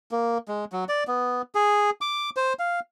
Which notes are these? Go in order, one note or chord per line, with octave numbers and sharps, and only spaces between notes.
A#3
G#3
F#3
D5
B3
G#4
D6
C5
F5